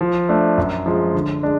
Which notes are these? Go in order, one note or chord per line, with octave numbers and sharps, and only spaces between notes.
F3
A3 D4
F#2
F3 G#3
D3
G#3 D4